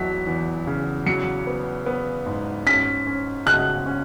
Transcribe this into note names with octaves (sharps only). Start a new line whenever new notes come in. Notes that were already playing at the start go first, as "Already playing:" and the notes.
Already playing: E2 F#3 B6
E2
C#3
F#3 C#7
B3
B3
G#2
C#4 B6
C#4
C#3 F#6
C#4